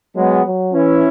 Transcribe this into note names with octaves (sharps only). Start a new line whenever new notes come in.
F#3 G#3 B3
F#3
E3 C#4 E4